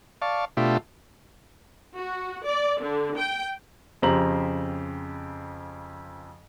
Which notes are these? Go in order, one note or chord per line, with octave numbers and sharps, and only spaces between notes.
D5 F5 A5 C#6
B2 A3 D4 F4 G4 E5
F#4
D5
D3
G5
F2 C#3 G4 C5 A#5 F#7